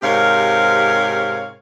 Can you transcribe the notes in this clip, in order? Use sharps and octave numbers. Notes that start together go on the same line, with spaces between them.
G#2 C3 G4 A#4 C#5 F5